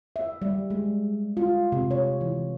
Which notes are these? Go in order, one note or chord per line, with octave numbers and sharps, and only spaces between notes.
E5
G3
G#3
F4
C3
C#5
E3